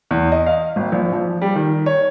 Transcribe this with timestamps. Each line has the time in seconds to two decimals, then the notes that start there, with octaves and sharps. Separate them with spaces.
0.11 E2
0.32 D#5
0.46 F5
0.76 G#1
0.92 A#1
1.13 F3
1.42 G3
1.55 D#3
1.86 C#5